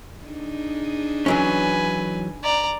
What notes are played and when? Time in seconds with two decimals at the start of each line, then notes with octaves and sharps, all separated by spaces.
0.23 D4 D#4 G#4
1.26 E3 F#3 C#4 B4 G#5
2.44 D5 A#5